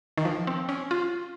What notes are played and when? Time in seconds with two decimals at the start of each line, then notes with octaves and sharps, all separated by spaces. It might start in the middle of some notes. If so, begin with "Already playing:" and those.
0.18 D#3
0.25 F3
0.47 C4
0.69 C#4
0.91 F4